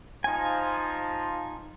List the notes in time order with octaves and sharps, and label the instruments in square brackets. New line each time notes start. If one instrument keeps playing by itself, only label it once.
[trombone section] F3 [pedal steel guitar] D#4 G#5